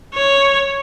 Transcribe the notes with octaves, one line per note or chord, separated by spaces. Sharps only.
C#5